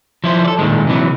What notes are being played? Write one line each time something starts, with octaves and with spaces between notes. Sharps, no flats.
F3 E4 C5
A4 D5
A#2 D#3 G#3
C3 E3 F#3